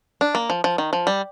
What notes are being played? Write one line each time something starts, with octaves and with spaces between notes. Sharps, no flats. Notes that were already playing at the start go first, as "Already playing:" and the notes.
D4
A#3
F3
F3
D#3
F3
G3